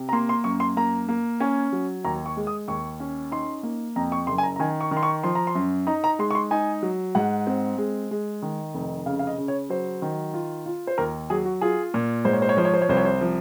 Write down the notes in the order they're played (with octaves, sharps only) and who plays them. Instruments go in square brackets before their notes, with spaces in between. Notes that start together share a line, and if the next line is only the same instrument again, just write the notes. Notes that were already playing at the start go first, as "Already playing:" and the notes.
Already playing: [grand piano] C3
A#5
A#3 C6
C6
F#2 C#6
C6
A#3 A#5
A#3
C#4 G#5
F#3
D#2 A#5
C#6
G#3
D#6
D#2 C#6
C#4
D#4 C6
A#3
F2 A#5
C#6
F#1 C6
G#5
A#5
A#5
D#3 G#5
C#6
D#3
C6
C#6
F3 C6
A#5
C6
F#2
D#4 A#5
A#5
G#3 C6
C#6
C6
D#4 G#5
F#3
G#2 F#5
C4
G#3
G#3
D#3
F1
C#3 F5
F5
D#5
C#3
C#5
F#3 C5
D#3
F4
F4
C5
D#2 A#4
F#3 G#4
F#4
F4 G#4
A#2
G#2 C5
C#5
C5
C#5
F3 C5
C#5
C5
C#5
C2 C5
C#5
C5
F3